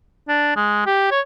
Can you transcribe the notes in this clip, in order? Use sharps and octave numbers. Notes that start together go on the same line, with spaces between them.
D4
G#3
G4
C#5